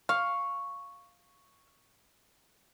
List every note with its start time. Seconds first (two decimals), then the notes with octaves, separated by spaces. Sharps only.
0.09 F5 C#6